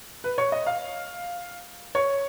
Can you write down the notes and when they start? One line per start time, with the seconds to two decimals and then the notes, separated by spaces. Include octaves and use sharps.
0.24 B4
0.38 C#5
0.52 D#5
0.66 F5
1.95 C#5